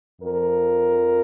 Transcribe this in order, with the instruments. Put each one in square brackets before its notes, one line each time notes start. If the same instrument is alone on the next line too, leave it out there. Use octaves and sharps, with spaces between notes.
[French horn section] F2 F3 A#4